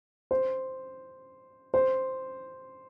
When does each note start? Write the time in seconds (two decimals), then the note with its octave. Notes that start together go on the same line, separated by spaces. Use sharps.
0.31 C5
1.74 C5